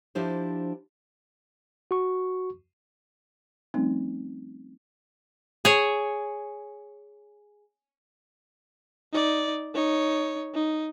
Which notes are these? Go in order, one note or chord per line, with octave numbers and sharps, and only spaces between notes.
F3 D4 E4 G4 C5
F#4 C#6
F3 G3 A3 C4 C#4 D#4
G#4 C#5
D#4 D5
D#4 C#5
D#4